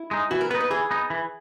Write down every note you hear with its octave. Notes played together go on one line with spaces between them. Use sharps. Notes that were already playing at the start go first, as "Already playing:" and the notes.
Already playing: E4
G#3 D#4
E3 F#4
A#4
B3 D#4 B4
B4
E3 G#4
B3 D#4
E3